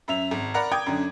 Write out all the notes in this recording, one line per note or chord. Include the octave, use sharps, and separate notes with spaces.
F#2 E5 F7
G#1
A#4 D5 F#5 A#5 B5
G5 D6 D#6 G#6
F#2 D3